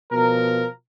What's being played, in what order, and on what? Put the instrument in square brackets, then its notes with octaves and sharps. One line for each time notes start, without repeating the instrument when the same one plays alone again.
[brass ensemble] B2 F3 A#4